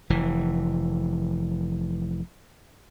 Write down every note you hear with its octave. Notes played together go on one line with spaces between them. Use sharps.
F1 E3